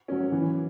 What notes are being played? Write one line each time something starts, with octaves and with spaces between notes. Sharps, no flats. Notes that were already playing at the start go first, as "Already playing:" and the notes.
F#3 C#4
E3